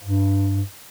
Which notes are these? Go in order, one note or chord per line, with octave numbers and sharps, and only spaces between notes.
G2